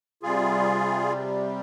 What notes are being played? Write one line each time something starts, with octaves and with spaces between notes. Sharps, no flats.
C3 G3 F4 G#4